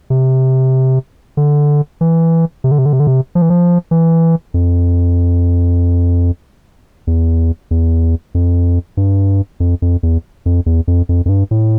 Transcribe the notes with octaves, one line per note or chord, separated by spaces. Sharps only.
C3
D3
E3
C3
D3
C3
D3
C3
D3
C3
F3
E3
F3
E3
F2
E2
E2
F2
G2
F2
F2
E2
F2
E2
F2
F2
F2
G2
A2